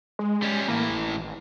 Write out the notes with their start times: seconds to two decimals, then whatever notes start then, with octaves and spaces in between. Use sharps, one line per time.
0.19 G#3
0.42 G3 C#4
0.68 A2 E3 A#3
0.89 G#1